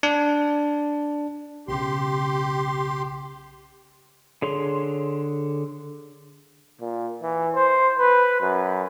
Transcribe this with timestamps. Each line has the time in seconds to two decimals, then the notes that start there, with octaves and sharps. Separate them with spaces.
0.03 D4
1.68 B1 C#3 G4 C6
4.42 D3 G#4 C#5 C6
6.81 A#2
7.22 E3
7.55 C5
7.99 B4
8.41 F#2